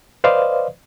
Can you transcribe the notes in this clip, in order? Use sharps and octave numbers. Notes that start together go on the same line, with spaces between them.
B4 C5 D5 D#5 F5